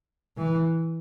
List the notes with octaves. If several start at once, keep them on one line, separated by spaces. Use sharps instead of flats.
E3